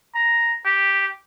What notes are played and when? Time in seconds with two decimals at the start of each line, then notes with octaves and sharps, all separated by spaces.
0.15 A#5
0.65 G4